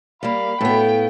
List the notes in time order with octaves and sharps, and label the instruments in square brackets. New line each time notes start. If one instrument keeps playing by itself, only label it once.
[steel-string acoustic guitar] G3 A#3 [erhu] F5 [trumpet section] B5
[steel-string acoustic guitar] A2 B3 [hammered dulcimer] A4 B4 F5 [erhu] G5